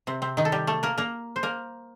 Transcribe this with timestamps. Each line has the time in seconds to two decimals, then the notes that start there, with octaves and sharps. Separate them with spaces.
0.07 C3 C4
0.22 C3 C4
0.37 D#3 D#4
0.45 A4
0.52 G3 G4
0.67 A3 A4
0.83 A#3 A#4
0.98 A#3 A#4
1.36 C5
1.43 A#3 A#4